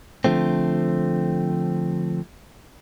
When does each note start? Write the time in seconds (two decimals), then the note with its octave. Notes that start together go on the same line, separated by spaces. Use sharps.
0.24 D3 F3 A3 C4